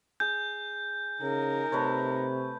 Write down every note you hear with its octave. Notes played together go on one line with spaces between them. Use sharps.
G#4 G6
C#3 D#4 A#4
C3 A3 B4 C#5